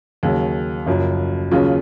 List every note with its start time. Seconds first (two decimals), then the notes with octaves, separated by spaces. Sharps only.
0.23 D#2 C#3 F#3
0.87 F#1 F#2 F3
1.51 D#2 C#3 F#3 C#4 F4